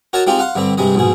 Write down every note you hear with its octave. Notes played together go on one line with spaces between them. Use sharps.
F#4 A#4 C#5 D#5 A5
G#3 C4 D#4 F4 G4
F5 F#5 C6
G2 D3 G3 C4
G2 C3 G3 G#3 D#5
A#1 G#2 B2 G#4